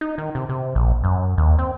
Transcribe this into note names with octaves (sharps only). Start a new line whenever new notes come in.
D#4
D#3
C3
C3
A#1
F#2
D#2
C4